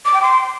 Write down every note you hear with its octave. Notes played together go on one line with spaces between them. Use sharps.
D6
G5
C6